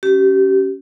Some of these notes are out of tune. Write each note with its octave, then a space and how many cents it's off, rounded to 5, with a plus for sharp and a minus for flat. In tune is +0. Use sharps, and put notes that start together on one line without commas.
C#4 +0 G4 -30